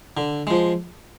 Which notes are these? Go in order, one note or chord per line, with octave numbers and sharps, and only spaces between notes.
D3
F3 G#3